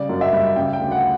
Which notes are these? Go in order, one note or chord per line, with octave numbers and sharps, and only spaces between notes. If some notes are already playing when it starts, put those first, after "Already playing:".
Already playing: C#3 G3 D5
F#2
E5
G3
C#3 G5
G5
D2
F#5